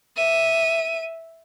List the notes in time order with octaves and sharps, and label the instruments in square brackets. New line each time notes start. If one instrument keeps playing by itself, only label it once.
[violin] E5 D#7